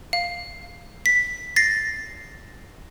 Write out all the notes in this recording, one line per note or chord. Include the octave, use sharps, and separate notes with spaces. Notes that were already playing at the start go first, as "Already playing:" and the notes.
F5
B6
A6 A#6 C7